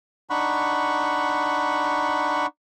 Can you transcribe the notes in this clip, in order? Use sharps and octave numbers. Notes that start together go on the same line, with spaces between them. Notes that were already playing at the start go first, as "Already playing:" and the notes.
D4 D#4 F#5 B5 C#6